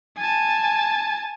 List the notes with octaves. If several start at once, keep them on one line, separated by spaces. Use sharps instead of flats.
G#5 A5